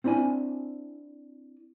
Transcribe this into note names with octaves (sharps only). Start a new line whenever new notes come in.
C4 D4 E4 D5 G#5